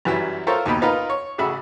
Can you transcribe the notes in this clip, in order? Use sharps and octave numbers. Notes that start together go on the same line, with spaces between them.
F#2 E3 F#3 G3 E4
F4 A4 A#4 C5 C#5 E5
D#2 B2 D#4 G5 B5 D#6
D#4 F4 A#4 B4
C#5
A1 C#3 F#4 E5 B5